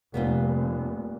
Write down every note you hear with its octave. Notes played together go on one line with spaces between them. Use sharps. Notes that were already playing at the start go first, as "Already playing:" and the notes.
F1 A#2 G3 B3